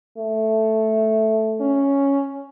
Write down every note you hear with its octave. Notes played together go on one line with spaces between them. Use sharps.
A3
C#4